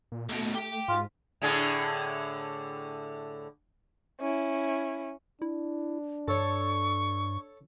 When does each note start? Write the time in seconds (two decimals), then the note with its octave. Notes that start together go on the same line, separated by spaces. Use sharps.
0.12 A#2
0.29 D#2 B2 A3
0.54 G4 G5
0.88 G#2 F4
1.42 A2 D3 G#4
4.20 C#4 E4
5.42 D4 E4
6.28 G2 A4 C#5 C#6